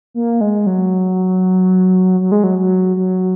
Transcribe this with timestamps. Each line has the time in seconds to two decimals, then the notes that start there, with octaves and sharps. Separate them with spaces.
0.14 A#3
0.41 G#3
0.67 F#3
2.20 F#3
2.32 G#3
2.44 F#3
2.58 F#3
2.97 F#3